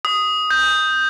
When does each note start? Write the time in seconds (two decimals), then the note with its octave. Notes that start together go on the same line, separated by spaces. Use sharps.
0.05 D#6
0.51 G6